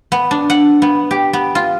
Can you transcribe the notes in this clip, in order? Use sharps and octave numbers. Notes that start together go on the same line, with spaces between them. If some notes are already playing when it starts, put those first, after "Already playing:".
B3
D4
F#5
B3
G4
B3
F4